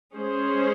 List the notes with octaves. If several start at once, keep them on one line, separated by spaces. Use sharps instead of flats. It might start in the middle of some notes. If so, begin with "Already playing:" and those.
G#3 C#4 G#4 C5